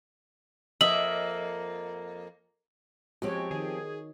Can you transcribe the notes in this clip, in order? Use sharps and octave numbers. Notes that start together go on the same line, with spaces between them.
F2 A#3 D#5 E5 F#7
F3 G#3 C4 F#4 G4 C#5
D#3 G#4